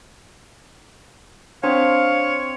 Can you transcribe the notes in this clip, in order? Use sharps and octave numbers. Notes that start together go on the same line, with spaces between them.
C4 D4 C#5 F5